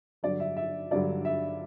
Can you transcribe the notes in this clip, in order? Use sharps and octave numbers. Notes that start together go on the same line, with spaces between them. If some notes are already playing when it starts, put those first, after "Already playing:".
G2 D3 F#3 D5
E5
E5
G2 D3 F#3 D5
E5